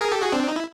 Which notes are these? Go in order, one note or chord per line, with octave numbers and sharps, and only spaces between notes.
G#4 A#4
G4 A4
F#4 G#4
C4 D4
D#4
E4